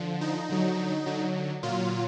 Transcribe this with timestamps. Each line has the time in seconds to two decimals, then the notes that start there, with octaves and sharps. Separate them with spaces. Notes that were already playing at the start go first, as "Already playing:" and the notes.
Already playing: D3 F3
0.21 D#4
0.49 D3 F#3
1.06 D3 F#3
1.63 A#2 F#3 F4